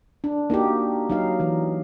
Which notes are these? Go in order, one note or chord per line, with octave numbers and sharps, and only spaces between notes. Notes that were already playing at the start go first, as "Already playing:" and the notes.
D4
A#3 D#4 F#4 G4
F#3 D#4 F5
E3